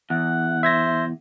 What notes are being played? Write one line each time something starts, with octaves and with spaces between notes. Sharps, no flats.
E2 F#5
C5 E5 G#6 A#6